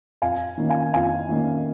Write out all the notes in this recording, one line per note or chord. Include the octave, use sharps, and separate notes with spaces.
F2 F5 G#5
D#3 A#3 C#4
F5 G#5
F2 F5 G#5
D#3 A#3 C#4